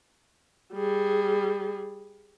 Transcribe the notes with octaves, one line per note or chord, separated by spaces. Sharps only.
G3 G#4